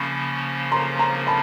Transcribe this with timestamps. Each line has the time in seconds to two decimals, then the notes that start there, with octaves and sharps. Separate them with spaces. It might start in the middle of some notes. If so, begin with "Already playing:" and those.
Already playing: C#3 F3 A#3 C#4 B5 C#6
0.72 A#5 C6
0.99 A#5 C6
1.27 A5 B5